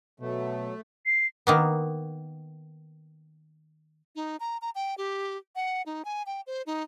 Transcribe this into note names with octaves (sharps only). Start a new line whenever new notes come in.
B2 F#3 A3
C7
D#3 A#3 B3
D#4
A#5
A#5
G5
G4
F#5
D#4
G#5
G5
C5
D#4